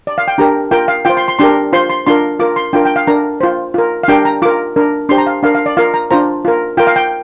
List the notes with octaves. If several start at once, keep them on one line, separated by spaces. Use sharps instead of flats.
D5
F5
G5
D4 G4 A#4 A#5
F4 A#4 G5
F5
F4 C5 G5
C6
C6
D4 G4 A#4 C6
F4 C5 C6
C6
D4 F4 A#4 C6
F4 A#4 D6
C6
D4 F4 A#4 G5
G5
F5
D4 A#4 A#5
F4 C5
F4 A#4
F5
D4 G4 A#4 G5
A#5
F4 A#4 D6
D4 A#4
D4 G4 C5 C6
A#5
F5
D4 A#4 F5
F5
D5
F4 A#4 F5
A#5
D4 F4 C5 A#5
F4 A#4
F4 A#4 G5
F5
G5